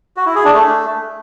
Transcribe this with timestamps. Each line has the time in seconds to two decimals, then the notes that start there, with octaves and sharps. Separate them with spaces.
0.17 F#4
0.26 E4
0.35 G#4
0.45 D4
0.54 A3